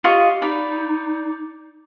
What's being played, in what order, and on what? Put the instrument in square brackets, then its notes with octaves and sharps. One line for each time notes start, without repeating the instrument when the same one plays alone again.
[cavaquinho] F4 D#5 C#6 [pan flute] G4
[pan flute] D#4 [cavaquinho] D5 B5